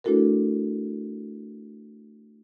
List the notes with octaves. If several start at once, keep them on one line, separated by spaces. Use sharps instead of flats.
A3 D4 E4 F#4 A4 A#4